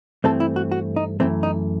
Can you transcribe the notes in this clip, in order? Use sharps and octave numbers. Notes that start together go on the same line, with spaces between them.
G2 E3 A3 C4 A4
E4
F#4
F#4
D#4
F#2 E3 A3 C4
D#4